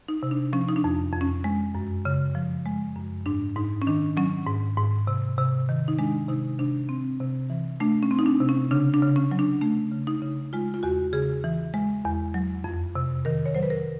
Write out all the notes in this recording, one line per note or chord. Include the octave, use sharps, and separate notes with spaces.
D#4
C3
D4
F3 C#4
D#4
D4
F2
F2
C#4
G#3
F#2
C#3
F3
G#3
F#2
G#2 D4
G#2 D#4
C#4
D#3 D4
F#3 C#4
G#2
G#2
C3
C3
D#3
D#4
G#3 D4
C3 D#4
C3 D4
C4
C3
E3
A3 D4
C#4
C4
D#4
D4
C3
C#4
C#3 D4
D4
C#3
C#4
F#3
D4
A3 D4
C#3
D#4
C#3
G#3 F4
F4
E2 F#4
C#3 G#4
E3
G#3
E2
F#3
F2
C3
D#3 A#4
C#5
F#3 C5
B4
A#4